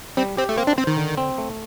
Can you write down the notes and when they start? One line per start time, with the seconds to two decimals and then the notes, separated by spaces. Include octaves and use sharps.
0.17 G3 C4
0.37 C4 G4
0.49 A3
0.57 A#3 C4
0.67 D4
0.78 C4 C5
0.87 D#3
0.97 D3
1.17 C4
1.38 A3